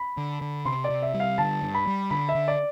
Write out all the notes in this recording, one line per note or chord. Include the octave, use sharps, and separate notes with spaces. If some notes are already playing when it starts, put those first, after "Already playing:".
Already playing: B5
D3
D3
C3 C6
D5
C3
E5
G3
F5
D3 A5
G2
B5
G3
D3 B5
E5
D3
D5